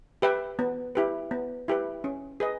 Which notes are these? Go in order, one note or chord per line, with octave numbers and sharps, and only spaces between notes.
G4 B4 E5 G5
B3
E4 G4 B4
B3
E4 G4 B4
C#4
G#4 B4 D#5